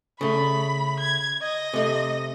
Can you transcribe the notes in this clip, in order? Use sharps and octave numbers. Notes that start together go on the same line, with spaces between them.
C#3 A3 B5
G#6
D#5
C3 A3